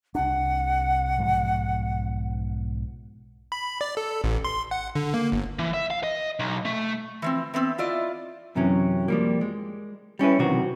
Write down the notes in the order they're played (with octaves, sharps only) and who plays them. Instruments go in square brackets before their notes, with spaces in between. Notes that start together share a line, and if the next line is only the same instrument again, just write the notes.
[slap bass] C2 D4 [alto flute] F#5
[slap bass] B1 G#2 F3
[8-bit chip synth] B5
D5
A4
A1
C6
F#5
D3
A#3
G1
[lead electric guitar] E3
E5
F5
D#5
B1
A3
[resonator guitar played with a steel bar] E3 F3 C4
E3 B3 C4
E4 F4 D5 D#5
[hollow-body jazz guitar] F#2 C3 E3 F#3 C#4
F3 G3 A#3
G#3
G3 C#4 E4 B4
B1 C3 D#3 E3 C4 F#4